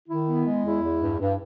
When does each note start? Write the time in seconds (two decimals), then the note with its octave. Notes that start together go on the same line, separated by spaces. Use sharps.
0.08 D#3 E4
0.27 B3
0.46 G#3
0.64 E2 E4
0.83 E2
1.01 G2
1.19 G2